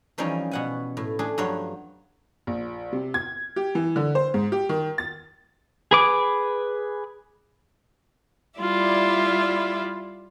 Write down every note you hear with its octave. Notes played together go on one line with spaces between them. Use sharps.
E3 F3 G3 C4 C#4 D#4
B2 F#5 G#5
A2
A3 D4 G#4
G2 F3 F#3 C#5 F5
A#1
C3
G#6
G4
E3
D3
C5
G#2
G4
D#3
A6
G#4 B4 D6
G3 E4 F4 D5 E5